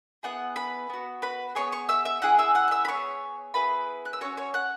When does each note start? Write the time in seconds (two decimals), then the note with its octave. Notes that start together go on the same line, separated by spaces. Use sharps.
0.23 B3 E4 G#4 F#5 F#6
0.56 B4 B5
0.90 B3 F#4
1.22 B4 B5
1.55 B3 G#4 C#5 C#6
1.72 C#5 C#6
1.89 E5 E6
2.05 E5 E6
2.22 C#4 E4 G#4 F#5 F#6
2.38 E5 E6
2.55 F#5 F#6
2.68 F#6
2.71 E5 E6
2.85 B5
2.88 B3 G#4 C#5 C#6
3.54 B3 E4 G#4 B4 B5
4.05 F#6
4.13 E6
4.21 C#4 F#4 C#5 C#6
4.37 C#5 C#6
4.54 F#5 F#6